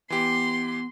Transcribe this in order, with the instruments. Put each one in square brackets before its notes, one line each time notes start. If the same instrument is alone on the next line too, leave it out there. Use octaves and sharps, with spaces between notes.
[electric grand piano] E3 G4 [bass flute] B3 [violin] C6